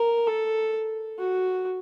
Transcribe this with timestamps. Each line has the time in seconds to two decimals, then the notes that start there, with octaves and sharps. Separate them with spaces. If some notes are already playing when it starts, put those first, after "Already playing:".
Already playing: A#4
0.27 A4
1.18 F#4